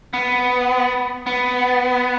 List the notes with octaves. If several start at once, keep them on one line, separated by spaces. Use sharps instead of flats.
B3
B3